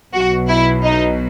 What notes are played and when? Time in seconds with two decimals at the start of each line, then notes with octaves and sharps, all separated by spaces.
0.14 B1 B2 F#3 F#4
0.48 E4
0.84 D#4